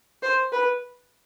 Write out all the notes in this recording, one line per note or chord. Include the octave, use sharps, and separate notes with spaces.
C5
B4